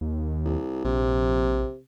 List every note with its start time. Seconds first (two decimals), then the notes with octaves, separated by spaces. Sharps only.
0.01 D#2
0.45 C2
0.85 A#1 C3